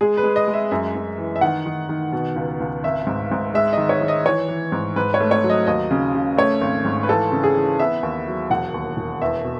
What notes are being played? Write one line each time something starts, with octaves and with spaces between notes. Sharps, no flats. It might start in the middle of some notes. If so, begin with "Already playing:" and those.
G#3 G#4
B4
G#3
D#5
G#3
E5
F#2 E5
F#2
E3
E5
D#3 F#5
D#3
D#3
B2
C#2
C#2
G#1 E5
G#2
G#2
G#3 E5
D#3 D#5
C#5
D#3
D#5
E3 C#5
E3
G#2
G#2 B4
C#5
A3
C#5
F#3
D#5
D#2 D#5
C#3
C#3
A3 C#5
G#1
G#2
B4
E3 A4
C#3
G#4
E3
B3 E5
D#2
F#3
E1 F#5
D#2
E1
E2 E5
B2